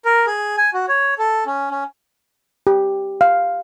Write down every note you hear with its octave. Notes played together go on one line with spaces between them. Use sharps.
A#4
G#4
G#5
F#4
C#5
A4
C#4
C#4
G4
F5